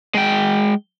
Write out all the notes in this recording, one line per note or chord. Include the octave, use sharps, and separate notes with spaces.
G#3 G5